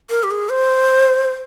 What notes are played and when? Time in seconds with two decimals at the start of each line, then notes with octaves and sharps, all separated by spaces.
0.10 A#4
0.23 G4
0.31 G#4
0.49 C5